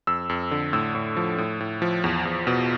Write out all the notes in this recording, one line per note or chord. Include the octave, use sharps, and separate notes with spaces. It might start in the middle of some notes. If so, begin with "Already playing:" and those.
F2 E6
F2
D3
A2 E6
A2
F3
A2
A2
F3
E2
E2
B2